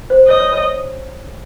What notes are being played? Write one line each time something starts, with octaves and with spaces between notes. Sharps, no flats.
C5
C#5 D#5
C#5
C#5